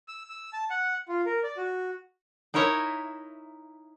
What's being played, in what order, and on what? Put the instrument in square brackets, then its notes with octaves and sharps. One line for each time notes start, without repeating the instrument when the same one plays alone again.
[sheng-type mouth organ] E6
E6
A5
F#5
F4
A#4
D5
F#4
[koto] D#4 E4 A#4 C#5 D#5 E5